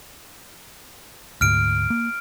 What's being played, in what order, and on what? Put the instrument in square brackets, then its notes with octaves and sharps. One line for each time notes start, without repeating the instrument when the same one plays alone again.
[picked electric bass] D2 G#2 [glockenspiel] F6 D7
[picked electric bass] A#3